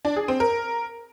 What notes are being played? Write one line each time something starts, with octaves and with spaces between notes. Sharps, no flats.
D4
G#4
C4
A#4